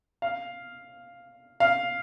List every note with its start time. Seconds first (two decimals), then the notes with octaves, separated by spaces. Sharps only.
0.22 F5
1.60 F5